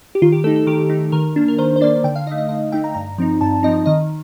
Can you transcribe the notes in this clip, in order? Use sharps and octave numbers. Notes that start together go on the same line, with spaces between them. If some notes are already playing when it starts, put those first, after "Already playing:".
G4
D#3 F4
G4
A3 D#4 A4
A4
D#3 G4
A3 D#4
D#3 A#4
A#3 D4
A#4
D#3 C5
C5
A#3 D4 D5
D3 G5
F5
A3 D#4 D#5
D#5
D3 D#5
A3 D#4 G5
A#5
G2 A#5
F3 C4 D#4
G2 A5
F3 C4 D#4 D#5
D#3 D#5